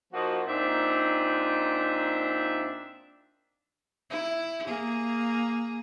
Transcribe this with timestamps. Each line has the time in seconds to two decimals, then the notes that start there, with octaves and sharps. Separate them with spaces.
0.13 F3 A#3 D#4 F#4
0.47 A#2 C4 D4 D#4 E5
4.10 E4
4.67 A#3 G#4